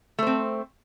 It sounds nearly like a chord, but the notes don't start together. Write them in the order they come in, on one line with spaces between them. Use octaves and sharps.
A3 C5 C4